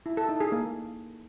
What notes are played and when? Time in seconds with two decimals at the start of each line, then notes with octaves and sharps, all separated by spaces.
0.06 E4
0.17 A4
0.29 D#4
0.40 G#4
0.52 A#3